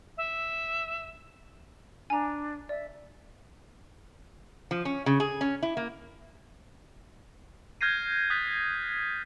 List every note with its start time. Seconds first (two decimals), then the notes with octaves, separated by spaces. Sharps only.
0.17 E5
2.10 D4 G#5 A#5
2.69 D5 E5
4.71 F3
4.85 C#4
5.06 C#3
5.20 G#4
5.41 C#4
5.63 E4
5.77 A#3
7.81 F6 G6 G#6 A#6 C7 D#7
8.30 D#6 F#6 A6 B6